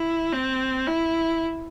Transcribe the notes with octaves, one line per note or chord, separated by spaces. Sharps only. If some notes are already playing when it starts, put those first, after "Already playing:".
Already playing: E4
C4
E4